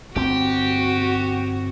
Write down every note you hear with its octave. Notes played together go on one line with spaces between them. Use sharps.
G1 C4 F#4 G4